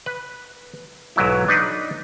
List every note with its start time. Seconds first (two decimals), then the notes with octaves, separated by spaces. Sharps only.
0.06 B4
1.16 B1 G#2 F#3 E4
1.48 D4 D#4 B4